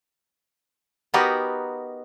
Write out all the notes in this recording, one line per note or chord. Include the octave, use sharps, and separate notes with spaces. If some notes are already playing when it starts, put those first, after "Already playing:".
B3 D#4 F#4 G4 A#4 B4